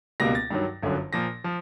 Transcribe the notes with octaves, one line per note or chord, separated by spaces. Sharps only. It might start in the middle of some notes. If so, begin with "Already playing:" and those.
C#2 B2 G3 A#3 A#6
A6
G2 D#3 F#3
G1 F#2 D3 F#3
A#2 F3 A#3 A#6
F3